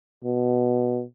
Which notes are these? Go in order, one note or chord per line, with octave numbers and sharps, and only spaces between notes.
B2